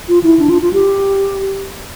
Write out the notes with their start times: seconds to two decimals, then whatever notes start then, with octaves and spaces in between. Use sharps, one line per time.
0.09 F4
0.24 E4
0.39 D4
0.49 F4
0.62 F4
0.73 G4